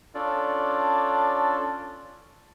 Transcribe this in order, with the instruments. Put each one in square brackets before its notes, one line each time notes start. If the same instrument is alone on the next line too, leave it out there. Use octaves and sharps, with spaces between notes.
[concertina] C#4 D4 F4 A4 D5